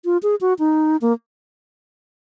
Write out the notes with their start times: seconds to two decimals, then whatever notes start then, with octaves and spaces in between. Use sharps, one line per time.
0.05 F4
0.23 G#4
0.41 F#4
0.59 D#4
1.01 A#3